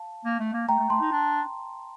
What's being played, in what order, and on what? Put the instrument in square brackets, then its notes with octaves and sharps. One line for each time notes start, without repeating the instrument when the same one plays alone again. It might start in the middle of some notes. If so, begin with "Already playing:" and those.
Already playing: [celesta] F5 A5
[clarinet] A#3
A3
A#3
[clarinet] A3 [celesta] G5 A#5
[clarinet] A3
[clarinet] A3 [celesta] A5 C6
[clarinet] D#4
D4